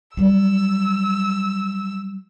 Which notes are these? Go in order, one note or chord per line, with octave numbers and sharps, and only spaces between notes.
F#3 G3 E6